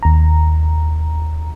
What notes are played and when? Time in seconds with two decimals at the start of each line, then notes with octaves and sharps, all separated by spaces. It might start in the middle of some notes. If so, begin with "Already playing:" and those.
0.03 D#2 A#5